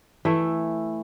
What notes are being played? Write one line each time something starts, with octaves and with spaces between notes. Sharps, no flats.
E3 A3 E4